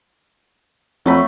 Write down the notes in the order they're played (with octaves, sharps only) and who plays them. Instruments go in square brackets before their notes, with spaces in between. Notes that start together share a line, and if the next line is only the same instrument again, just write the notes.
[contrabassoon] F2 [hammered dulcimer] F#3 A3 B5